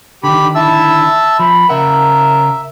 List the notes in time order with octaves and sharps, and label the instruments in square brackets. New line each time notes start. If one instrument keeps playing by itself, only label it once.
[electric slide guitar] D3 D#3 [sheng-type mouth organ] G4 B5
[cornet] E4 [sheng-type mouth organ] E5 A5 E6
[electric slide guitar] F3 [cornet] B5
[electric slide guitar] C#3 F#5 [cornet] A#4 [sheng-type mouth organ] E5